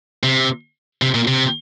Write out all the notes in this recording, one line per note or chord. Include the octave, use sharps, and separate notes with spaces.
C3
C3
A#2
C3